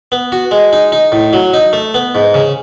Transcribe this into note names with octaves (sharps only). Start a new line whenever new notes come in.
B3
F#4
G#3
D#4
D#4
A2
F#3
D#4
A3
B3
G#2
C#3